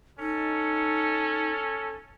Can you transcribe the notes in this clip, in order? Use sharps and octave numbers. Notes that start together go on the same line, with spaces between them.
C#4 D#4 A4